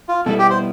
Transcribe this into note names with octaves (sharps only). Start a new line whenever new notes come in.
F4
B2 G3 B3 E4 A4
G4
C5